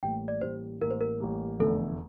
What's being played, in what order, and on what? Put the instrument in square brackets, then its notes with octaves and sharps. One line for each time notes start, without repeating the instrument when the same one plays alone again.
[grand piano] A1 A2 G3 A#3 [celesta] G5
[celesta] D5
[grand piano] A1 A2 G3 A#3 [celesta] C5
[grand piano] A1 A2 G3 A#3 [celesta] A#4
[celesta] C5
A#4
[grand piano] A1 A2 G3 A#3
[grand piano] F1 E2 D3 A3 [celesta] A4